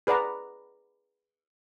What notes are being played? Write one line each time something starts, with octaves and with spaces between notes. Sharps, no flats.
G#4 B4 D5 F#5 A#5